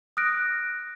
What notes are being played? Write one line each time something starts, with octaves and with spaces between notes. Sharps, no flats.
D#6 F6 F#6 A#6 D7